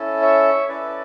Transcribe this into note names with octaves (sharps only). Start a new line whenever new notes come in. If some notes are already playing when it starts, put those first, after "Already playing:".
Already playing: C#4 E4 A4
C#5 E5
C#4 E4 A4 B4 D5